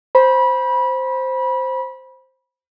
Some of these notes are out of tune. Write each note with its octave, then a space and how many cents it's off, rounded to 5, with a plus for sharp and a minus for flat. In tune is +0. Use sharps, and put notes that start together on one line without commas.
C5 +0 B5 -25